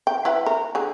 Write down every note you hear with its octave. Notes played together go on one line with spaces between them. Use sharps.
G5
E4 B4 F#5
A#4
D3 G#4